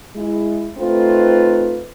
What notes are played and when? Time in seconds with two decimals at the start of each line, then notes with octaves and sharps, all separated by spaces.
0.16 G#3 E4
0.78 A3 C4 D#4 F4 B4